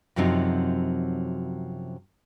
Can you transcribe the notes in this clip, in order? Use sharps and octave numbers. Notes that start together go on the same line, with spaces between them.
F#2 C3 F3 F#3 C4 D#4